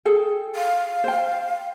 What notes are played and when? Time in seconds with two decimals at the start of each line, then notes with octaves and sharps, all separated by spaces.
0.05 G#4 A4 G5
0.56 F5
1.04 C5 G5